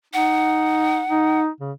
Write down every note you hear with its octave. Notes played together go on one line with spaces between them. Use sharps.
D#4 F#5
D#4
C#3